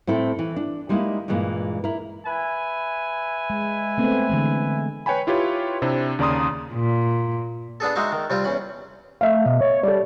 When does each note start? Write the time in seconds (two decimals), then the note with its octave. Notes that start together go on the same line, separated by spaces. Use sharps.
0.07 A2 C4 E4 A4
0.39 E3
0.56 D4
0.89 G3 G#3 A#3 D#4 E4
1.28 G2 A#2 E3 G#3 A#3
1.84 E4 A#4
2.25 B4 E5 G#5
3.50 G#3
3.98 A3 B3 C4
4.30 D3 E3 G#3
5.06 B4 C#5 G5 G#5 B5
5.27 E4 F4 G4 B4 C#5
5.82 C3 C4 D4 E4
6.19 D#2 C#3 D5 A#5 C6 D#6
6.74 A#2
7.80 B3 D4 G#4 A4
7.96 G#3 D#4 F#4 E5 F5
8.12 D#3
8.30 C3 G3 C4 F4
8.44 E2 C#4 B5
9.21 A3 E5 F5
9.46 B2 D#5
9.61 C#5
9.83 G3 A4 D5